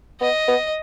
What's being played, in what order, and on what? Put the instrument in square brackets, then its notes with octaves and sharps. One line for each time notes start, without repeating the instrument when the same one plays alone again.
[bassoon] B3 [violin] D#5
[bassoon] B3